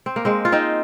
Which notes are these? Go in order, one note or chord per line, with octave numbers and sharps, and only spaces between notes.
C4
A#3
G#3 C4
F4
C4 D#4